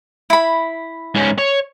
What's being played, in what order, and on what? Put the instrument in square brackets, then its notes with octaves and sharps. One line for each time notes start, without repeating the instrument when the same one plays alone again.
[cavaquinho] E4 B5
[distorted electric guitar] G#2 C#4
C#5